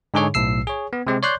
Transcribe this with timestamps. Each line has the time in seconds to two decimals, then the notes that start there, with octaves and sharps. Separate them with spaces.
0.14 G#2 D3 D#4 G#4 C#5
0.34 B1 A2 E6 C7
0.67 G#4 C#5
0.93 B3
1.07 C3 G#3 C4
1.23 C#5 D5 C6 F#6 G6